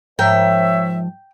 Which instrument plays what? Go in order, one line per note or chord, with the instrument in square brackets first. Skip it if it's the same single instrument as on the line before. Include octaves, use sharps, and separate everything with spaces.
[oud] G#2 F3 A#4 [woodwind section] C5 C#5 E5 [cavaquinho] G5